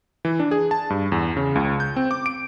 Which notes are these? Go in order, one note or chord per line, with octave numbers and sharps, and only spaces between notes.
E3
D4
G#4
A5
G2
E2
C#3
C#2
G6
C4
D6
D7